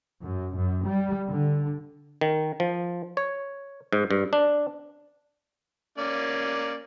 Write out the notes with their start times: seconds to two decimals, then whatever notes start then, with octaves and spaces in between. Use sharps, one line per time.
0.22 F#2
0.56 F#2
0.85 G3
1.27 D3
2.21 D#3
2.60 F3
3.17 C#5
3.93 G#2
4.11 G2
4.33 D4
5.98 A#3 C#4 D5